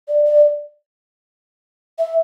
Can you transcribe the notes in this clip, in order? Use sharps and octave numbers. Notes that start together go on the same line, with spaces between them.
D5
D5
E5